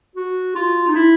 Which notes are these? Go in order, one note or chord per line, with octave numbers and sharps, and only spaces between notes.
F#4
F4
D#4
E4